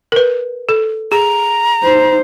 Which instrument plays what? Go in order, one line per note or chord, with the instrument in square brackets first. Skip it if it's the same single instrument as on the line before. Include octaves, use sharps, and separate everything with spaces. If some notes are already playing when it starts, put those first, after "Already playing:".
[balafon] A#4 B4
A4
[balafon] G#4 [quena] A#5
[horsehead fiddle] D#4 C5